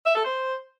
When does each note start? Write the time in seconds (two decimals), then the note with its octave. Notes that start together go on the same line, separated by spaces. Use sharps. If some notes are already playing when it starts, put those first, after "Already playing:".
0.06 E5
0.15 A4
0.25 C5